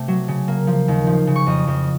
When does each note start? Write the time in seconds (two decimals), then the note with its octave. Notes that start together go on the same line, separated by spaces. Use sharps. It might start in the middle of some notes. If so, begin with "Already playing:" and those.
Already playing: C3 A3
0.08 F#3
0.28 C#3
0.48 A#3
0.67 F3
0.88 D#2
1.07 F3
1.27 C#3
1.36 C#6
1.47 F2 D#6
1.67 F2